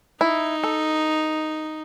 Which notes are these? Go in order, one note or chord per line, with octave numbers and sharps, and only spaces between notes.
D#4 E4
A4